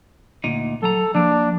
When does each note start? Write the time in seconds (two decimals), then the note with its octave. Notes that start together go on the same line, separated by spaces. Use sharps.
0.44 D2 A#2 D#4
0.83 F#3 A4 A#5
1.15 F3 A#3 D4